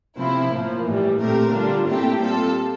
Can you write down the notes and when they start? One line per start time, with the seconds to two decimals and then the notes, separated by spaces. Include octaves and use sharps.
0.17 C3 F3 C4 E4
0.51 A2 F3 A#3
0.85 A2 E3 G3
1.19 A#2 A3 C4 G4 A#4
1.52 D3 G3 D4 F4
1.87 A#2 A3 C4 E4 G4
2.21 G3 C4 F4 A4